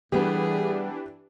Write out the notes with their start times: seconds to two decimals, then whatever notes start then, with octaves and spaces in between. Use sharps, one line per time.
0.12 A2 E3 G3 B3 D4 G4 G#4 B4